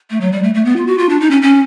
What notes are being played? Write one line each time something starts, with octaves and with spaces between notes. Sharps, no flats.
A3
F#3
G3
A3
A3
B3
F4
F#4
F4
D4
D#4
C#4
C#4